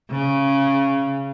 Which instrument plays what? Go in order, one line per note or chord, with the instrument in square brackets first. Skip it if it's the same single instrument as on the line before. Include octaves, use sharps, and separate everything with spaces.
[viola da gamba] C#3